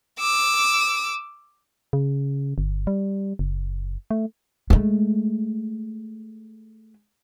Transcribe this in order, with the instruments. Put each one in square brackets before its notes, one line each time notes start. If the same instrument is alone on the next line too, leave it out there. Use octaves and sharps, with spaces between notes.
[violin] D6 E6
[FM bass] C#3
G1
G3
F#1
A3
[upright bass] G#3 A3